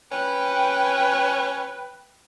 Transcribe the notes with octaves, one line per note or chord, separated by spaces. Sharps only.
C#4 B4 G5